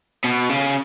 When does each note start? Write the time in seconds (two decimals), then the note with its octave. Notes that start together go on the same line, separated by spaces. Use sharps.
0.24 B2
0.49 C#3